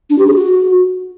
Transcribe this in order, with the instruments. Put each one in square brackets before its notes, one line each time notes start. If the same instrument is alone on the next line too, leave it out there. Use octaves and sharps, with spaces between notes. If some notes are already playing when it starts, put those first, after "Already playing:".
[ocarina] D4
G4
G#4
F#4